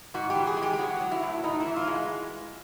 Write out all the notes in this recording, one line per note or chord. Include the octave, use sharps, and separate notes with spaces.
G#2 F#4
G4
E3
G#4
G#3
G4
G4
F#3 F#4
F#3
E4
A2
A2 D#4
E4
E3
F4
G#3 F#4